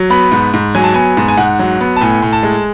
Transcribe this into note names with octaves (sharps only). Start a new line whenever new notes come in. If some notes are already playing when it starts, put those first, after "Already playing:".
Already playing: F#3
B3 B5
G#2
G#2
F#3 G#5
A5
B3 G#5
G#2
G#5
G#2 F#5
F#3
B3
A5
A2 G#5
A2
A5
G#3